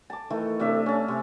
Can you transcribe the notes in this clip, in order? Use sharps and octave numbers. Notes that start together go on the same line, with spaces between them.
A5 D6
D#3 E3 A3
C3 A3 D4 E5
C#4 A5
C3